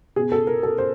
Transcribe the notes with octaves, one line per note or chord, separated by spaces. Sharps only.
B2 G#4
A4
A#4
A4
C5